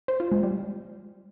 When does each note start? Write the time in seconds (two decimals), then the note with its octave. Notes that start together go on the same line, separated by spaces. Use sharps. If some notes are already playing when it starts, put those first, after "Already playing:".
0.08 C5
0.20 F4
0.32 G#3
0.43 G3